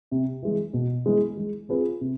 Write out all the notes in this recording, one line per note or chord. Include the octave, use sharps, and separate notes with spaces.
C3
E3 G#3
B2
G#3 B3 E4
G#3
C4 F4 G#4 B4
C3